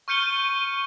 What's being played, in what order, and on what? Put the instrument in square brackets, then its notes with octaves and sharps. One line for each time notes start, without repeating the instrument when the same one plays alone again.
[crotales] C#6 F6 G6 C#7 D#7 G7